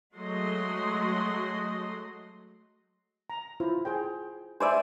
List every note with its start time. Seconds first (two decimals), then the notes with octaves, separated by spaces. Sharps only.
0.15 F#3 G#3 A3 D#5 C6
3.30 A#5
3.60 E4 F4 C5
3.85 G#4 C5 G5
4.60 C5 D5 E5 G#5